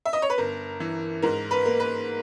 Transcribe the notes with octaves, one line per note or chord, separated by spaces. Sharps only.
E5
D#5
C#5
B4
G1 A#4
E3
G#2 A#4
B4
A#3
B4